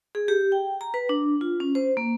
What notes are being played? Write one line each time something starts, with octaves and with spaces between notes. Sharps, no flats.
G#4
G4
G5
A#5
B4
D4
F4
C#4
C5
A#3